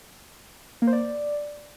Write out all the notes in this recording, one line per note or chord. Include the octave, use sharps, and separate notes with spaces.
A#3
C5
D5